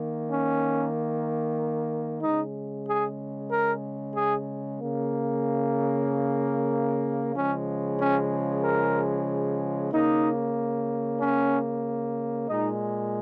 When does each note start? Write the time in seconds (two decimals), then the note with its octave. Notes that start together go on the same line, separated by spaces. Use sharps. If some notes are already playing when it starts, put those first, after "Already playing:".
Already playing: D#3 A#3
0.31 C#4
2.23 C#3 G#3 D#4
2.87 G#4
3.51 A#4
4.15 G#4
4.79 C#3 A#3
7.35 C#3 F3 G#3 C#4
8.00 C#4
8.63 A#4
9.92 C#3 A#3 D#4
11.19 C#4
12.48 A#2 G#3 D#4